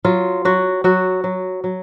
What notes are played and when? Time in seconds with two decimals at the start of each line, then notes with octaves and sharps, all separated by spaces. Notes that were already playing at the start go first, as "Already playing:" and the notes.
0.05 F#3 F4
0.45 F#3 F#4
0.84 F#3 F#4
1.24 F#3
1.64 F#3